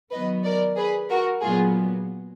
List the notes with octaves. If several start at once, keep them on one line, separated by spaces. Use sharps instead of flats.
D#3 F#3 B3 B4 D#5
A#4 D5
G#4 B4
F#4 A#4
A#2 F#3 B3 F4 G#4